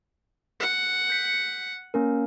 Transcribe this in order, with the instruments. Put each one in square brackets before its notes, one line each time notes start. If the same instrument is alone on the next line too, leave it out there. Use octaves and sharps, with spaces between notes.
[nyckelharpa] F#5
[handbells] G6 B6 C#7
A#3 C#4 A#4